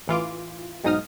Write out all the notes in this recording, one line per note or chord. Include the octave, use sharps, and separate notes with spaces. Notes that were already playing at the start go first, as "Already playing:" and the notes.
A1 E3 F4 D6
B1 G#2 D#4 D#6 F6